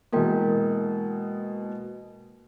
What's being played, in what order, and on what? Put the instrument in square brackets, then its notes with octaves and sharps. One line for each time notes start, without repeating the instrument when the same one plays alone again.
[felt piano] B2 E3 G#3 [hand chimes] A#3 A#4 G5